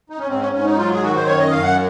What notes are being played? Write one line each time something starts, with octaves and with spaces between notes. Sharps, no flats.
D#4
C#4
G#2 C4
C#4
G#2 C#4
D#4
F#3 F4
G#4
D#3 F#4
C5
F#2 C#5
D#5
F#2 F5
F#5